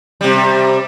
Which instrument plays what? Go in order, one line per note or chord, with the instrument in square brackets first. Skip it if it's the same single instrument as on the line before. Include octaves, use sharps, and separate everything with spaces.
[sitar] C3 G3